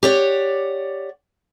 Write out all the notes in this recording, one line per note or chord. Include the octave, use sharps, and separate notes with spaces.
G4 C#5 D5 F#5